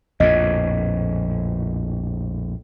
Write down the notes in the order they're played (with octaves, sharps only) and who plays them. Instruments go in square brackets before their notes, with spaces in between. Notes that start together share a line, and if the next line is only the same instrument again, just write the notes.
[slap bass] A#1 F2 A2 [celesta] D#5